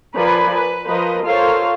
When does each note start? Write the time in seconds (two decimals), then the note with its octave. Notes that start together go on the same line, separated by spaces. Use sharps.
0.14 F3 A#4 B4 D5 G#5 B5
0.52 B4
0.86 F3 A#4 B4 D#5
1.24 F4 A4 A#4 C5 C#5 F5